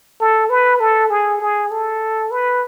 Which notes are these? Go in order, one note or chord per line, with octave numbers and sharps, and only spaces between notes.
A4
B4
A4
G#4
G#4
A4
B4